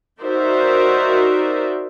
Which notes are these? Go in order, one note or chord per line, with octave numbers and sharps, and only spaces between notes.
D#4 F#4 A#4 C5 D5 E5